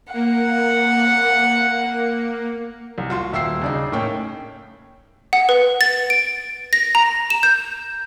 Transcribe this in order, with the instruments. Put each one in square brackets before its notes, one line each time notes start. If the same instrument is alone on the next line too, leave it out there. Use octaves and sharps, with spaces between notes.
[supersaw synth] A#3 [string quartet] F#5
[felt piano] C2
F4 F#4 C6
D#1 E5 G5 E6 C7
C#3 D4 D#4
A2 A#3 C#4 G5 G#5
[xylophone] F#5
B4
A6
D7
A#6
A#5
E7
G6